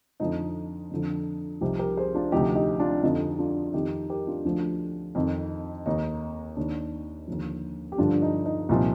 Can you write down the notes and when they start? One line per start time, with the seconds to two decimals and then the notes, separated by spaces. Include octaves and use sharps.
0.20 F2 D3 F3 D#4
0.91 F2 D3 F3
1.61 C2 C3 F3 D#4 G4
1.79 G4 A#4
1.97 G#4 C5
2.14 D4 F4
2.32 D2 C3 F3 D#4 G4
2.55 D#4 G4
2.80 D4 F4
3.03 F2 D3 F3 D#4
3.39 D4 F4
3.73 F2 D#3 D#4 G4
4.10 G4 A#4
4.27 D4 F4
4.45 D2 D3 F3
5.15 F2 D#3
5.86 D#2 D#3 D#4
6.57 D#2 D#3 D4
7.28 D#2 D3 F3
7.92 G4
7.98 G2 D3 F3 D4 F4
8.22 D#4
8.46 D#4
8.69 C2 A#2 F3 D#4